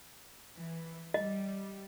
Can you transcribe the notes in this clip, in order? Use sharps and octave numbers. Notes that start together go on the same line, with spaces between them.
E3
G3 D#5